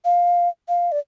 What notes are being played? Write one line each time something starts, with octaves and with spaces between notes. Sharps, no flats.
F5
F5
D5